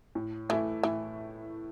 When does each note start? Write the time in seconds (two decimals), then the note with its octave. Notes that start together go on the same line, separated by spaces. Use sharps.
0.15 A2
0.49 E3 A3 E4
0.83 A2 E3